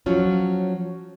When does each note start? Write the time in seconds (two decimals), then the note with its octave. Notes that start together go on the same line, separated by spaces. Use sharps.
0.06 F3 F#3 C#4 F4